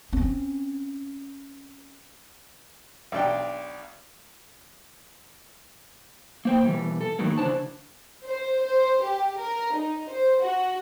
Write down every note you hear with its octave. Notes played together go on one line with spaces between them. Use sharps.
C4 C#4
B1 D4 G5
A#3 C5 G5
B2 E3 G3
A4
A2 D#3 E3 F#3 G#3 A#3
C#3 E3 D4 C5 A5
C5
C5
G4
A#4
D#4
C5
F#4